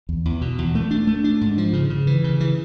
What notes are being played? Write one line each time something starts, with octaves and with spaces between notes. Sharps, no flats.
E2
E2
B2
E2
A3
D4
A3
D4
G#2
F3
C#3
C#3
E3
C#3
E3